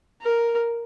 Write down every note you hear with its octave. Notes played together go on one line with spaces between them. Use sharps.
A#4